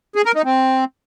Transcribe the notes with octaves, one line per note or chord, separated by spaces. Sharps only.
G#4
A#4
D#4
C4